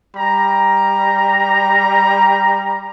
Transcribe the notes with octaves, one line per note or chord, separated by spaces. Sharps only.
G3 A#5